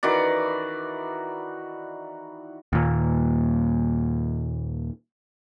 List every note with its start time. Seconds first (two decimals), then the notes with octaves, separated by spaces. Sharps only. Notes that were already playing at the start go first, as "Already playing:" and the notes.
0.03 D#3 E3 F#4 D5
2.73 D#2 A#2